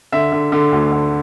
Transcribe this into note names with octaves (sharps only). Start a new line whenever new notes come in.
D3 E5
D3
D3
D2
D3